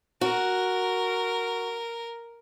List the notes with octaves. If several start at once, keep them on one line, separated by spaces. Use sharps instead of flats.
F#4 A#4